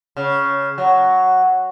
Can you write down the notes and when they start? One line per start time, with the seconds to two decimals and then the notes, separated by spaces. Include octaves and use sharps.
0.17 C#3
0.78 F#3